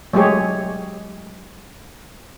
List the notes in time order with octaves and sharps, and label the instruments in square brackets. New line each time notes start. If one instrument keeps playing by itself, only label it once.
[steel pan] F#3 G#3 A3 G4 G#4 C#5